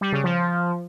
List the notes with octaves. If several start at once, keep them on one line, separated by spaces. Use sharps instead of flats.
G3
C#3
F3